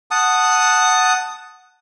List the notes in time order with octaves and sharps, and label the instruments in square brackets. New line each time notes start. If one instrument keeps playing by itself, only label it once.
[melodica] F#5 A5 D#6